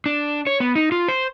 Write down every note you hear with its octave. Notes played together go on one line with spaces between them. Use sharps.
D4
C#5
B3
D#4
F4
C5